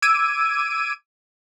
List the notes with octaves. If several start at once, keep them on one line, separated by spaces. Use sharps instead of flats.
D6 E6 G#6 D7 D#7